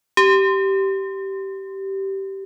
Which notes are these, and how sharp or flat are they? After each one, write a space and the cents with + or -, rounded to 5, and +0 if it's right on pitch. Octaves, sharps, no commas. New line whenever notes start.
G4 -15